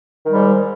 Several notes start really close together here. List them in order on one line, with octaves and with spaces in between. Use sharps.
D#3 G3 G#2